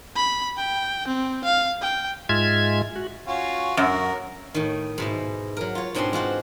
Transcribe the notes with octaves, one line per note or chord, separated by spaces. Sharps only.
B5
G5
C4
F5
G5
G#2 G#3 F4 E5 G#6
F#4
C#4 F4 F#4
F#2 F#4 A#4
A2 D#3
G#2 B2 E4
F#3 A#4
F4 C#5
G#2 B2 C4 D4 G#5 C6
G#3 F4 F#4 C5